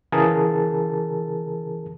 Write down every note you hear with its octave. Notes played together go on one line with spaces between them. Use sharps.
C#3 E3 G#4 A#4 A5